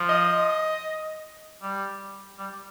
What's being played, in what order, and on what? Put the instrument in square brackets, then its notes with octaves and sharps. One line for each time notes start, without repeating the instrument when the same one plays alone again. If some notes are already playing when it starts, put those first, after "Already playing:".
Already playing: [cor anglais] F3
[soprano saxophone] D#5
[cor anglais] G3
G3